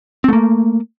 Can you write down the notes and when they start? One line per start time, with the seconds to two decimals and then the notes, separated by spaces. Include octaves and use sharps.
0.24 C4
0.28 A3
0.33 A#3